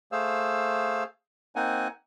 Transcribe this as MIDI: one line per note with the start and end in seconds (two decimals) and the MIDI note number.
0.12 1.04 57
0.12 1.04 68
0.12 1.04 72
0.12 1.04 77
0.12 1.04 88
1.56 1.88 58
1.56 1.88 60
1.56 1.88 63
1.56 1.88 78
1.56 1.88 80